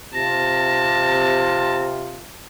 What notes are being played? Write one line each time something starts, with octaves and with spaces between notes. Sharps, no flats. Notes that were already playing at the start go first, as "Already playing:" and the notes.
C3 F4 A5 A#6